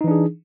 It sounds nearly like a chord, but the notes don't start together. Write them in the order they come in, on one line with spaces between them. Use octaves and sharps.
D#4 E3 D4 G#4